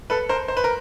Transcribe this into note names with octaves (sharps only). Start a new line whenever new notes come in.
A4 B4
A#4 C5
C5
B4
A#4